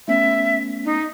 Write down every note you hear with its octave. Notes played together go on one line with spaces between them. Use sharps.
A3 B3 C#4 E5
D#4